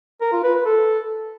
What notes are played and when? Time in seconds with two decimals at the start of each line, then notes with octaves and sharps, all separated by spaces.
0.21 A#4
0.32 F4
0.43 B4
0.54 B4
0.66 A4